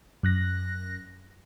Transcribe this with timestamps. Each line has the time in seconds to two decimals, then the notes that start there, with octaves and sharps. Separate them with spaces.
0.23 F#2 F#6 A#6